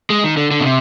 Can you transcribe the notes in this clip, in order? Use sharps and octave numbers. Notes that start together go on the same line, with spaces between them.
G#3
D#3
D3
D3
B2
C3